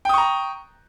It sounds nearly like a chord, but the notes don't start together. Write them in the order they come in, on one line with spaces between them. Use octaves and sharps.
G5 D#6 C#6 A#5